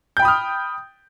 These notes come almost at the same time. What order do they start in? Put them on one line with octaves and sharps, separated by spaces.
G6 G5 B5 D#6 F6